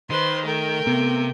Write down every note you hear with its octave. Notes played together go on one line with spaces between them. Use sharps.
D#3 B4 C5 C6
A3 A#4 G5
C3 B3